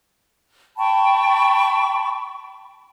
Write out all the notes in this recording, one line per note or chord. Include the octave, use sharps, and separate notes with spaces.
G5 A5 B5 C#6